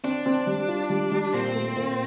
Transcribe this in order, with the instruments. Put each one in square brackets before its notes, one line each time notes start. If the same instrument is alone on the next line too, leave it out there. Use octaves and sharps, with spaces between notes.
[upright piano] C4 [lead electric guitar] D4
[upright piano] C4
G3
F4
G3
G3
[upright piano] A#2 [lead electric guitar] C4
[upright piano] A3
A#2